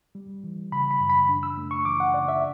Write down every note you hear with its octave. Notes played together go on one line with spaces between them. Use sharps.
G3
E3
C#3 B5
B5
F#2
B5
D4
E6
A3
C#6
E3 D6
F#5
C#3 D5
E5